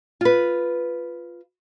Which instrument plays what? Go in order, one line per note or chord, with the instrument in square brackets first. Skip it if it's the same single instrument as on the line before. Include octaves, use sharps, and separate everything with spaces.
[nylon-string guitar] F4 B4